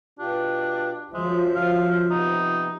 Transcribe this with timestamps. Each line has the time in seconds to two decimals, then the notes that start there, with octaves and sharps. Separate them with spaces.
0.19 B2 D4 F4 G4
1.14 F#2 F3 G#3 C5 E5
1.55 F5
2.11 C3 B3 D#4